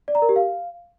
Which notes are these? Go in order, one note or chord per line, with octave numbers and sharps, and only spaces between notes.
D5
A#5
A#4
G4
F5